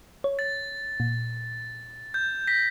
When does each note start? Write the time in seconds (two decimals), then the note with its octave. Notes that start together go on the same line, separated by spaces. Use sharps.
0.24 C#5
0.39 A6
1.00 A#2
2.14 G6
2.47 A#6 B6